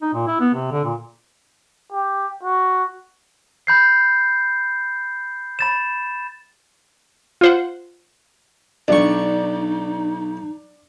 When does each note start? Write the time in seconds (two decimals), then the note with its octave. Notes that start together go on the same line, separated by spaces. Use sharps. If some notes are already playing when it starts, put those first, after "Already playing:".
0.02 D#4
0.14 A#2
0.27 E4
0.41 B3
0.54 C3
0.72 D3
0.84 A#2
1.92 G4
2.43 F#4
3.67 B5 G6 C7
5.59 B5 A6 E7
7.41 F4 C5 F#5
8.88 B1 D4 D#4 C#6